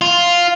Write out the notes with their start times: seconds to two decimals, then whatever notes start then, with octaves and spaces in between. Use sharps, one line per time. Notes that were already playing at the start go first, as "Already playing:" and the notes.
0.02 F4